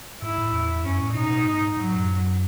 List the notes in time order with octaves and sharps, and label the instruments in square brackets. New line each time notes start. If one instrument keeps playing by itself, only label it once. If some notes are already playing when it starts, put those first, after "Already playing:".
[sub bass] G#2 [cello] E4
[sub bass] A2
E2
[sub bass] F#2 [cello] C#4
[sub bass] A2
[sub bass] B2 [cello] D#4
[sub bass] B2
G#2
[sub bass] G#2 [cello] F#3
[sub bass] A2
F#2